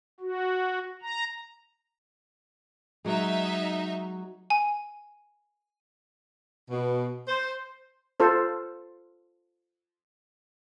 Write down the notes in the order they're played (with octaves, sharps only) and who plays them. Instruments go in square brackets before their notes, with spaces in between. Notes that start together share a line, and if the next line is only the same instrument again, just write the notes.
[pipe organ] F#4
A#5
[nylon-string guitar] F#3 G#3 [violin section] D#4 E5
[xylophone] G#5
[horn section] B2
C5
[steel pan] F4 A4 C5